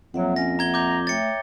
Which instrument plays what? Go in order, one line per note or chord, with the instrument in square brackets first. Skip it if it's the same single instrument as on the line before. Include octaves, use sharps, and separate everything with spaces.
[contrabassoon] F2 [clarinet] F#3 [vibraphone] A#3 E5 F#5
[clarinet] C#4 [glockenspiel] A#6
[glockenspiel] A#5 G#6 G7
[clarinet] A#5 [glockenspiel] D6 G6
[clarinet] A3 [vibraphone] C#5 E5 G5 [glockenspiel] A6 C#7